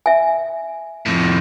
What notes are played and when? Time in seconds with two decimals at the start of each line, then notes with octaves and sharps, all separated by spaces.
0.06 E5 G#5
1.06 F2 A2